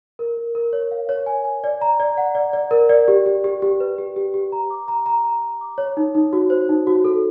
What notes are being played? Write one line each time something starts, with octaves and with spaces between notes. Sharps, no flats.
A#4
A#4
A#4
C#5
F5
C#5
G#5
G#5
D5
A#5
D5
F#5
D5
D5
A#4
D5
G4
G4
G4
G4
B4
G4
G4
G4
A#5
D6
A#5
A#5
A#5
A#5
D6
C#5
D#4
D#4
F#4
C5
D#4
F#4
A4